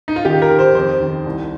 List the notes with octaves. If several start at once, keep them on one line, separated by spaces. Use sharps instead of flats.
D#4
F4
D#3 G4
A#4
D#2
C5
F2 C5
D#3
C2